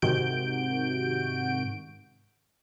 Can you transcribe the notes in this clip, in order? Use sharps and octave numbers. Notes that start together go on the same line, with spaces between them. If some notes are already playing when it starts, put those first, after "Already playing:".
G#2 C3 D#3 F#4 G6 D7